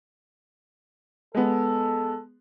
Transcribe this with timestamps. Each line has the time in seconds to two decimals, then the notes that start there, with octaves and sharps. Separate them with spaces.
1.35 G#3 B3 A4